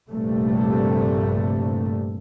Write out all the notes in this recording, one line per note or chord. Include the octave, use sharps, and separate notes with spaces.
A#1 G2 C3 A3